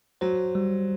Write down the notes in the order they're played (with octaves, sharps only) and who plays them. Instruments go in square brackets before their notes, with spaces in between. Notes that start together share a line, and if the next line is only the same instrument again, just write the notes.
[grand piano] F#3 [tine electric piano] C5
[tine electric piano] G3